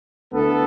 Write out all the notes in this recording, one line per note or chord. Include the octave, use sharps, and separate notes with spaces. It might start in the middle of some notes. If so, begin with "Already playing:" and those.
D2 D3 B3 E4 A4